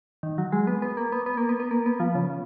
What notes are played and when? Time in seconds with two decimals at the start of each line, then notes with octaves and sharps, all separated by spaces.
0.23 D#3
0.38 F#3
0.52 G#3
0.67 B3
0.82 B3
0.97 A#3
1.12 B3
1.26 B3
1.37 A#3
1.49 B3
1.60 B3
1.71 A#3
1.86 B3
2.00 F3
2.15 C#3
2.30 C#3